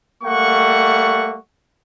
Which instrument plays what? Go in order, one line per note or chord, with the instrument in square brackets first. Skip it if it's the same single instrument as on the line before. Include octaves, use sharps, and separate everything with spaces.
[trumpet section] G3 A3 A#3 F#5 C#6